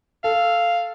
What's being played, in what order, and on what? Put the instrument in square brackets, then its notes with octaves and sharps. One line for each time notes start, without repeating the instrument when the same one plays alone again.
[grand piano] A4 [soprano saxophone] F5